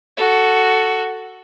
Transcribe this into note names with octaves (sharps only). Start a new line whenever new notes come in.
F#4 A4